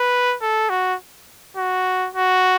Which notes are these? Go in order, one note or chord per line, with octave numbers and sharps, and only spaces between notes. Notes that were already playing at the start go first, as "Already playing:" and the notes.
Already playing: B4
A4
F#4
F#4
F#4